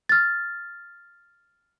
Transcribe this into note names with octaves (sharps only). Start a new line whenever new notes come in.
F6 A6